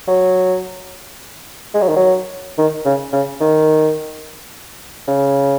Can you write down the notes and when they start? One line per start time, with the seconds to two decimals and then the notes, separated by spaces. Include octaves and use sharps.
0.08 F#3
1.74 G#3
1.82 F#3
1.89 D#3
1.96 F#3
2.58 D#3
2.85 C#3
3.13 C#3
3.41 D#3
5.08 C#3